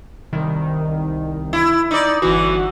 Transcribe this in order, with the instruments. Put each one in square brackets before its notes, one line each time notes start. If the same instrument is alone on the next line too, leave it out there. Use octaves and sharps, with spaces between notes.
[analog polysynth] C2 D#3
[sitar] E4
D#4 D5
[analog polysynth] G1 F#4 [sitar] E3